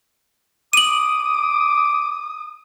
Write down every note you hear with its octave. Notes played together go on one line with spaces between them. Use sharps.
D6 D#6 D#7 F#7